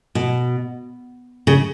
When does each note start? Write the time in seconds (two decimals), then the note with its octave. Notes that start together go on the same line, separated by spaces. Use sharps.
0.15 B2
1.47 C#3